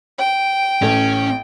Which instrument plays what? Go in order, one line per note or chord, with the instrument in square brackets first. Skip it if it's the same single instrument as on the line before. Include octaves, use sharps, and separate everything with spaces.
[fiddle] G5
[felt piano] A1 A4 [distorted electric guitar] C#4